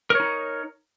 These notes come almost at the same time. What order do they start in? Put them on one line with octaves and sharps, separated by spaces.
A#4 C#5 D#4